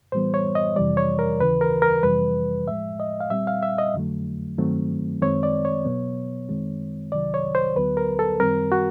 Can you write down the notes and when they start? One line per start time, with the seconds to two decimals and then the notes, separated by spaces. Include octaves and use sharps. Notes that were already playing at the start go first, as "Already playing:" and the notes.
0.12 A2 E3 G3 B3 C5
0.34 C#5
0.55 D#5
0.76 F2 C3 E3 G3 D5
0.97 C#5
1.19 A#4
1.40 D#2 C#3 E3 B4
1.61 A#4
1.82 A#4
2.03 F2 C3 E3 G3 B4
2.67 A2 F3 G#3 E5
3.00 D#5
3.20 F5
3.30 A#2 G3 C4 E5
3.47 F5
3.63 E5
3.78 D#5
3.94 F2 D3 F#3 A3
4.58 G2 D#3 F#3 A3 C4
5.22 F#2 D#3 G#3 C4 C#5
5.43 D5
5.65 C#5
5.85 B2 F#3 B3
6.49 F#2 D#3 G#3 C4
7.12 C2 C3 D#3 F#3 D5
7.34 C#5
7.55 C5
7.76 D2 D3 F#3 B3 B4
7.97 A#4
8.19 A4
8.40 F#2 D#3 G3 C4 A#4
8.72 F#4